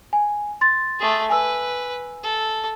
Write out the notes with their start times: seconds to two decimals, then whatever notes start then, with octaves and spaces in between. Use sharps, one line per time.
0.13 G#5
0.61 C6 A6
0.99 A3 G#4
1.30 B4 G#5 E6
2.23 A4